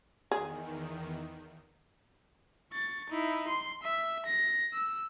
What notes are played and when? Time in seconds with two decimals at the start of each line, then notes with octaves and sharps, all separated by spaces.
0.31 E2 D#3 G#4
2.73 C#6 A6
3.10 D#4 E4
3.48 C6
3.83 E5
4.26 A#6
4.73 E6